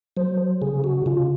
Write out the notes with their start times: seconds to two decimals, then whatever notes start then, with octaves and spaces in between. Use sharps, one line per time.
0.17 F#3 C5
0.62 C#3 G#4
0.84 F#4
1.06 C#3 F4